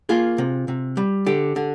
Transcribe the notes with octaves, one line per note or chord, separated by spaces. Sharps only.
A#3 F4 G#4
C3
C3
G3
D3 G4
D3